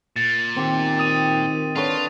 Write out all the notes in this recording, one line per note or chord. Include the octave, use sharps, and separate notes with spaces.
A#2 A6
D#3 C4 G4
D#6 D#7
D3 F4 B4 C#5